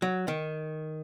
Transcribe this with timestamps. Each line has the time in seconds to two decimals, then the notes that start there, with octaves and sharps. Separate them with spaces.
0.02 F#3
0.28 D#3